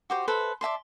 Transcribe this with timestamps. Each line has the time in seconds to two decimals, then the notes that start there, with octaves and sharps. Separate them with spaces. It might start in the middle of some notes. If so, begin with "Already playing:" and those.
0.10 F#4 G4 C5
0.27 A4 B4 C5 E5
0.61 D5 E5 A5 C6